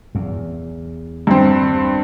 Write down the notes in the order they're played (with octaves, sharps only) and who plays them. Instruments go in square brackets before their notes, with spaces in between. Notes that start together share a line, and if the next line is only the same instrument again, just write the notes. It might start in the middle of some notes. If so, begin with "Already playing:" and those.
[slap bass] E2
[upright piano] G2 C4